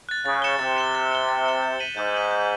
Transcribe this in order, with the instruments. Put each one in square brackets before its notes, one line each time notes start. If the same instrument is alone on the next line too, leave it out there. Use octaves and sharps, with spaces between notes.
[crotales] F#6 A6
[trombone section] C#3 [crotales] A6
[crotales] C#7 E7 G7
[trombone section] C3 [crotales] A6
[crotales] C#7 E7 G7
A6
C#7 E7 G7
A6
C#7 E7 G7
G6
B6 D#7 F#7
[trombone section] G#2 [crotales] G6
[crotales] B6 D#7 F#7
G6